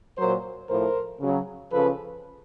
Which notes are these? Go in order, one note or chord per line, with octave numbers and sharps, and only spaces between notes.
A#2 F#3 A#4 C5
A2 F3 A#4 C5
C#3 F#3
C#3 F3 A4 B4